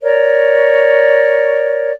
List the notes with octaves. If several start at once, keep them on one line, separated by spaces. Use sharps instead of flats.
A#4 C#5 D5